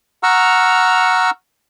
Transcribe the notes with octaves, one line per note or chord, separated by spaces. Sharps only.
F#5 A#5 C#6 E6 F6